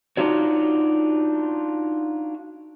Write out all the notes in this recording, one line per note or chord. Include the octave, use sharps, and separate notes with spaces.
D4 D#4 F4 F#4 C#5